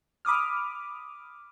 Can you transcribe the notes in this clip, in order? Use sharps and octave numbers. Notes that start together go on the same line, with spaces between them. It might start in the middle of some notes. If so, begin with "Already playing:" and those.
B5 D6 D#6 F6